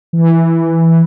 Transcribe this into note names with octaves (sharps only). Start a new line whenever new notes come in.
E3